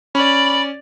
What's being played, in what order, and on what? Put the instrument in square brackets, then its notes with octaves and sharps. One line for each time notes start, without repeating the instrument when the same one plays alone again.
[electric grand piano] C#4 [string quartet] D5 [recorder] B5